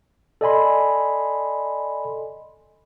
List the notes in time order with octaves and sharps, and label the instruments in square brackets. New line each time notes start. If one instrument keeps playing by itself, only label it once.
[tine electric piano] A4 D5 D#5 G#5 B5 C6